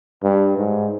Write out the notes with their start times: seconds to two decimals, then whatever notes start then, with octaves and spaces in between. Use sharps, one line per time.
0.23 G2
0.57 G#2